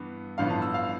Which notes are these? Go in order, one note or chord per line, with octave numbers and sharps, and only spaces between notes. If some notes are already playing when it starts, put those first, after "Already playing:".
Already playing: G2 E3 B3
A1 G2 D3 F3 B3 F5
A5
E6
F5